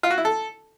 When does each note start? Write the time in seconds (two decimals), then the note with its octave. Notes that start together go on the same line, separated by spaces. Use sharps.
0.03 F4
0.11 F#4
0.18 E4
0.25 A4